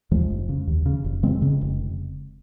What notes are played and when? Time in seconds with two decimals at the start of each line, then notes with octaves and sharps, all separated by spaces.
0.11 D#2 F3 G#3
0.30 F1
0.49 C#3
0.67 D#2
0.86 C#3
1.05 F1
1.23 C#3 G#3 C4
1.42 C#3
1.61 F1